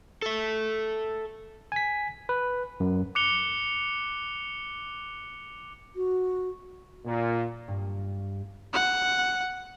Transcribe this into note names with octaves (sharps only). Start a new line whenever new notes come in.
A4 E5
G#5 B6
B4
F#2
D6 F#6 C#7 F7 G7
F#4
A#2
G2
F#5